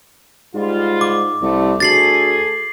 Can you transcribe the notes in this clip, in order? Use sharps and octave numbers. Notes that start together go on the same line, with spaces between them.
G#2 G3 F4
D6
C2 G3 A3
D2 G#4 A4 A6 C7 F#7